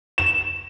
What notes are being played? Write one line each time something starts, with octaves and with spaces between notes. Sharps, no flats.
E7